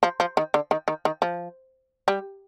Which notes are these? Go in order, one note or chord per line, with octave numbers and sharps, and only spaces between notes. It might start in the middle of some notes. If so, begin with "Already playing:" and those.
F3
F3
D#3
D3
D#3
D#3
D#3
F3
G3